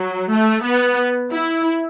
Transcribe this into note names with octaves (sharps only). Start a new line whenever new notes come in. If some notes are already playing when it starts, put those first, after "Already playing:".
Already playing: F#3
A3
B3
E4